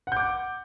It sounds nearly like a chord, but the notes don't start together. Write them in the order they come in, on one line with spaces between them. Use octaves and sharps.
F#5 G6 D6